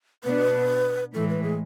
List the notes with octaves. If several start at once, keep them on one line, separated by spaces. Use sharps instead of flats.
B2 B3 D4 B4
A2 E3 G#3 A4
B4
G#4